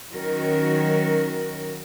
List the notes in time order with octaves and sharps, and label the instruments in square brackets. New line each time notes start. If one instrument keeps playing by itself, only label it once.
[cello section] D#3 F#3 C#4 F#4 A#4